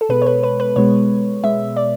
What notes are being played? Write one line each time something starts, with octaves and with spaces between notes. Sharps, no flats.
A4
B2 G#3 B3 B4
C#5
B4
B4
B4
B2 G#3 B3 C#5
B2 G#3 B3 E5
D5